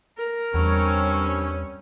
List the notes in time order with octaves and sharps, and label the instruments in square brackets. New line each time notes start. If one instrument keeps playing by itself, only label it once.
[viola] A#4
[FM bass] E2 [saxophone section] G2 C4 C#4 [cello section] G3 C#5